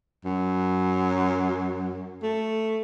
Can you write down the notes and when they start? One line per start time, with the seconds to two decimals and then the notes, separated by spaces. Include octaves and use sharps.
0.25 F#2
2.23 A3